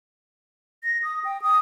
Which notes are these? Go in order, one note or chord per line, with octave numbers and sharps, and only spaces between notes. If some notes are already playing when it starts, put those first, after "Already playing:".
A#6
D#6
G5
D#6